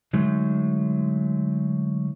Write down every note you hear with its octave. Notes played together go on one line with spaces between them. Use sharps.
D3 F#3 G#3 A3 D#4